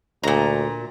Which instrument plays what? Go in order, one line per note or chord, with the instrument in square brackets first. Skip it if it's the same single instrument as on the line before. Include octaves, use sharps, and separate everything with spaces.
[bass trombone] D2 [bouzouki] A#2 A#5